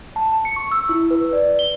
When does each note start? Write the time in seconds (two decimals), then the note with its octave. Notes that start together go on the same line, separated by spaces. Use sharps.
0.16 A5
0.45 C#7
0.56 C#6
0.72 E6
0.89 E4
1.10 B4
1.33 D5
1.59 G7